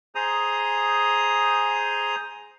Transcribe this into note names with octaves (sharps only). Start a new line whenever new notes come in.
G#4 C5 A#5 D#6